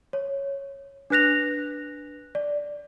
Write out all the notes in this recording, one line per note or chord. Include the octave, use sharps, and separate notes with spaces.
C#5
D4 B4 F#6 A#6 F7
D5